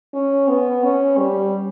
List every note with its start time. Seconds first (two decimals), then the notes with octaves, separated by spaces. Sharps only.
0.13 C#4
0.48 B3
0.83 C#4
1.17 G3